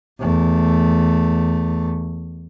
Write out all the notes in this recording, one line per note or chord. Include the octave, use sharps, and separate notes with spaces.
E2 A3